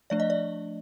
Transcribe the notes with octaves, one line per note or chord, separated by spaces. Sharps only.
F3 A3 D4 D5
D#5
D5